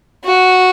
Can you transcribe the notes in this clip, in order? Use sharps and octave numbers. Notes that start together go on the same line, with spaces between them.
F#4